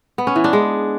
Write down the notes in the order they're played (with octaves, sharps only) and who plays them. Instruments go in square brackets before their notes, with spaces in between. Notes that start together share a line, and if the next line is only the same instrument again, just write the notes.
[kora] B3
C#4
E3
D4
G#3